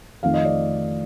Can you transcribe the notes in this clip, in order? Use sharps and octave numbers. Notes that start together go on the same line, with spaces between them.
F2 D#3 A3 F5
D#5
D5